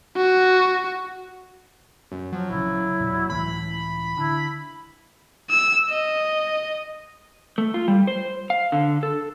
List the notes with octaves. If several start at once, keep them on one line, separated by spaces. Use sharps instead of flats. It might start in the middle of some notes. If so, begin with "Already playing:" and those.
F#4
F#2
F3 F#3
A#1 C#3 E4
E1 A#2
C#2 A2 E3 B5
D3 E4
E6
D#5
A3
F4
G3
C5
F5
D3
A4